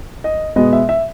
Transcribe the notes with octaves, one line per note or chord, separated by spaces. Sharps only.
D#5
B2 G#3 B3 D#5
E5
E5